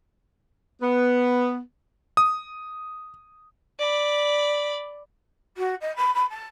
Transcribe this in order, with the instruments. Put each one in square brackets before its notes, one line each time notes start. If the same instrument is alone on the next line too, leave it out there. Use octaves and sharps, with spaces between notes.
[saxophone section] B3
[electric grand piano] D#6
[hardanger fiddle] D5 B5
[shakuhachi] F#4
D#5
B5
B5
A5